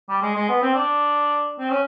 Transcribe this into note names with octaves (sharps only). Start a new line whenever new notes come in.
G3
G#3
G#3
B3
C4
D4
C4
C#4